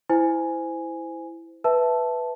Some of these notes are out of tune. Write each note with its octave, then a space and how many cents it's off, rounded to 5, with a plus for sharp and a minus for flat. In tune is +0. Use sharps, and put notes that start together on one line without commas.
E4 +0 C5 -25 G#5 +0
B4 +0 E5 +0 A5 -5